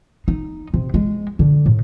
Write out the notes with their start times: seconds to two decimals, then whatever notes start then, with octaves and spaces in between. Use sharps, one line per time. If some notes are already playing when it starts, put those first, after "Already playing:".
0.28 D#4
0.74 C3
0.94 G#3
1.39 D3
1.66 A2